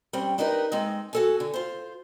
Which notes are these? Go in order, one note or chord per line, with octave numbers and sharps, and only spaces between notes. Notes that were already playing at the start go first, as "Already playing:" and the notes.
G3 C4 C#4
D4 D#4 G4 A#4 B4 D#5
G#3 C4 D#4
F#4 A4 G#5
D3
F4 C5